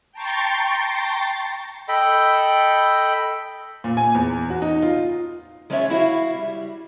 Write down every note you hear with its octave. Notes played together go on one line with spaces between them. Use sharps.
G5 A5 A#5 C6 C#6 A6
A4 D#5 G5 B5
A#2
G#5
E2
F#4
D#4
F4
F#3 G#3 C#4 F4 C#5 E5
E4 F#4 E5 F5
G3